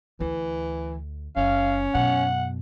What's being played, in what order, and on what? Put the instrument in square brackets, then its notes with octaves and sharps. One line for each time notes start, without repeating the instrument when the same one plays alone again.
[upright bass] D2 [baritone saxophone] E3
[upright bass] F#1 [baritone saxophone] C#4 [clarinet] F5
[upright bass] F#2 B2 [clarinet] F#5